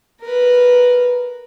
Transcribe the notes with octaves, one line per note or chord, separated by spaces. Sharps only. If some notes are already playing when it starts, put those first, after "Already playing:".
A#4 B4